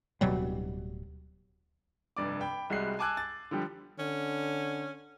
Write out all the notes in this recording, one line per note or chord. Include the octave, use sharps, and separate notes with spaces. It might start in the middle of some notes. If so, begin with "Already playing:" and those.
D1 B2 F#3 G3
F1 G2 D5 D6
G5 B5
C2 G3 G#3 F#4 F#6 C7
G#5 A5 D6 E6 F#6 G#6
A6
D3 F3 G3 G4
D3 C#4